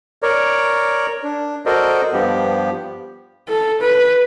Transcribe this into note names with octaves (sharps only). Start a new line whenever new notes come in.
A#4 C#5 D5
D4
F#4 A4 A#4 C5 D5 D#5
G2 F3 B3 G4
A4
B4